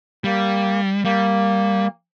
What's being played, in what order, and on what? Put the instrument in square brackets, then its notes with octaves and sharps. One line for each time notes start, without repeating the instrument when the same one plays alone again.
[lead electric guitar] G3 [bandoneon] A#3
[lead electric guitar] G3 [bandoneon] A#3